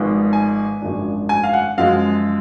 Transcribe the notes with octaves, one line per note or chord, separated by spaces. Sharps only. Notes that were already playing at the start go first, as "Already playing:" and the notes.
Already playing: G#1 G#2 F3 G#3 B3
G#5
G#1 F#2 F3 G#3 D4
G#5
F5
F#5
F#2 F3 G#3 F5